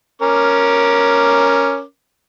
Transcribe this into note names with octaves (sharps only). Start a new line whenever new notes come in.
C#4 A#4 D6